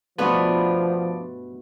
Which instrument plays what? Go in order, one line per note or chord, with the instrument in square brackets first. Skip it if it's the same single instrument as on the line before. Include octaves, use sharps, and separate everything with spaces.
[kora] G2 B2 A3 [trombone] F3 [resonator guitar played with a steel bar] B3 D4 F4 [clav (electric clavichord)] B4